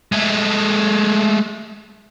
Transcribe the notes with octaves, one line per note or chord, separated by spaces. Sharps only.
G#3 A3